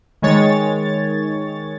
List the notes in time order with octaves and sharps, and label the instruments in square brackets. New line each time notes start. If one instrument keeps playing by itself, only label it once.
[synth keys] D#3 G#3 C#5 A6